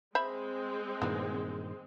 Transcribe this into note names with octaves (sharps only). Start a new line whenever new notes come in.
G#3 C4 C5 E5 B5
G2 A#2 D#3 E3 F#3